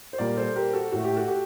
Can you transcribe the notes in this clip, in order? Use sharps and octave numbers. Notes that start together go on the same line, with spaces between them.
C5
A#2 G3 A#3 A#4 D5
A4 C5
G4 A#4
F#4 A4
A2 A3 F#4
G4
F#4 A4
G4